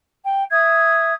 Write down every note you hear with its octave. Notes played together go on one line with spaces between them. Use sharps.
G5
E5 D#6 G#6